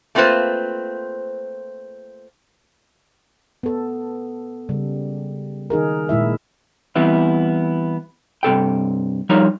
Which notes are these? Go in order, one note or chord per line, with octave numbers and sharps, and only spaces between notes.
A3 A#3 C4 F4 B4 C5
B3 A4
C#3 G3
D#3 D#4 G#4 A#4
A#2 G#3 E4 E5
E3 G3 B3 C4 E4
G2 C3 A4 G5
F3 G3 D#4 A#4 C#5